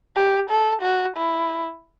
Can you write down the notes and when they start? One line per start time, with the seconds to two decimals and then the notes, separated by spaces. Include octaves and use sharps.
0.16 G4
0.50 A4
0.82 F#4
1.16 E4